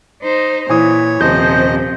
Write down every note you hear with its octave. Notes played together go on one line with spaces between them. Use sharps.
D#4 C5
A#2 E3 C#5 D#6
D#1 C3 F3 C5 D#5 G6